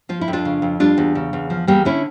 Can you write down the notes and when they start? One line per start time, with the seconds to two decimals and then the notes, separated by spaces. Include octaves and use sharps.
0.09 F3 F4
0.21 E4
0.28 F2
0.33 D4 F4
0.45 C#3
0.62 F2
0.80 G3 D4 F4
0.98 E2
1.15 C#3
1.33 E2
1.50 F3
1.67 E2 G3 A#3
1.85 D3 C#4 E4